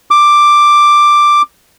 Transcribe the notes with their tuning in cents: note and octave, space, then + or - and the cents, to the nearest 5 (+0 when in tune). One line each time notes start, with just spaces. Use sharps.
D6 +5